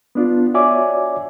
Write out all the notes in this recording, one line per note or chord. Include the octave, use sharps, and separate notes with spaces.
B3 D4 F4
F#4 C#5 D5 E5 G#5 D6